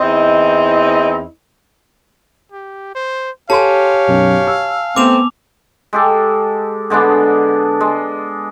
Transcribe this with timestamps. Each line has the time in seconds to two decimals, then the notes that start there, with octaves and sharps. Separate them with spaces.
0.01 E2 C4 D#4 E4 D#5
2.52 G4
2.95 C5
3.50 G4 A4 C#5 F5 G#5 A5 C6
4.08 B1 F#2
4.47 E6
4.96 A3 B3 C4 D6 F7
5.93 G#3 G4 A4
6.90 D3 G#3 B3 D4
7.81 G#3